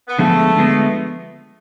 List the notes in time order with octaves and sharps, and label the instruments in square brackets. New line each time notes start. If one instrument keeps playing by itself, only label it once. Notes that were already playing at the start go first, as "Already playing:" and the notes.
[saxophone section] B3
[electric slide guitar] D3 F3 G#3 B3 [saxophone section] A3
[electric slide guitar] D3 F3 G#3 B3